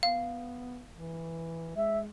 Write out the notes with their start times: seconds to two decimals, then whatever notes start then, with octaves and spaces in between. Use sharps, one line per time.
0.03 B3 F5
0.96 E3
1.76 G#3 E5